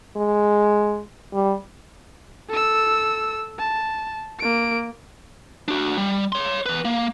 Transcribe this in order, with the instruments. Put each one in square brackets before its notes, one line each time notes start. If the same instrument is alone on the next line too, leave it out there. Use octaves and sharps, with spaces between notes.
[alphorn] G#3
G3
[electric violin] A4 E6
A5
A#3 D7
[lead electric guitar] D4 F#4
G3
C#5 C6
E2 B4
A#3